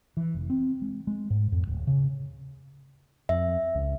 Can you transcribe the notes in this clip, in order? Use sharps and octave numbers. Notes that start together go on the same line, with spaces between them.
E3
F1
C4
G#3
G#3
G#2
F2
D1
C#3
F2 E5
C#2